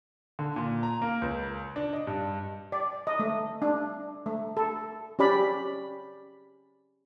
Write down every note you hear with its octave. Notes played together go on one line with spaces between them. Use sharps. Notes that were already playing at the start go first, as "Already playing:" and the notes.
D3
A#2
A#5
A#3
C#2
D4
D#5
G2
D5
D#5
A3
D4
A3
A4
C#4 G4 D5 B5